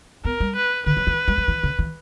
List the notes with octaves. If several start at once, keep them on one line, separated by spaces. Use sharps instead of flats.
B3 A#4
G3
B4
D3 B4
F#3
E3
G3
F#3
E3
C#3
E3